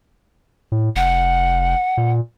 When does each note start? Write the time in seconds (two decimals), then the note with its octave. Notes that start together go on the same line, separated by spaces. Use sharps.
0.72 A2
0.96 F1 F#5
1.97 A#2